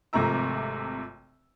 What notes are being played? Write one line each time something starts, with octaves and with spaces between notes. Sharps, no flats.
G#1 C3 F3 A3 A#5 E6